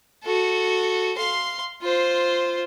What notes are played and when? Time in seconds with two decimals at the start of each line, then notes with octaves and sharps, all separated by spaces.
0.24 F#4 A4
1.18 F5 C6
1.81 F4 C5